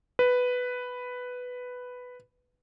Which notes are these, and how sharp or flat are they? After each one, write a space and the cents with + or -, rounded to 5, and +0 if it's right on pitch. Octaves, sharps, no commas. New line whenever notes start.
B4 +5